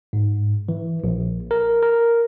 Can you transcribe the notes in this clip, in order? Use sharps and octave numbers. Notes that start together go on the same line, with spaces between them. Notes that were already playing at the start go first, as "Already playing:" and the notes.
G#2
E3
A#1
A#4
A#4